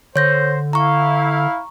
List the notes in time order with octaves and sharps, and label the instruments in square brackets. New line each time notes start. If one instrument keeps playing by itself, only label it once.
[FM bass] D3 [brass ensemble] C5 [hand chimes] C#5 G6 A#6
[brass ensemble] E4 F5 [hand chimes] A#5 C#6